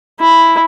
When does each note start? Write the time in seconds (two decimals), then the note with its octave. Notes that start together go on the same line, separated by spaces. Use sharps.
0.20 E4